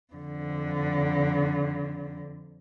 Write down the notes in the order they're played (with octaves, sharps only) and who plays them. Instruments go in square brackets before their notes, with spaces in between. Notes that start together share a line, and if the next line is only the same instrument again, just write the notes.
[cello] F2 D3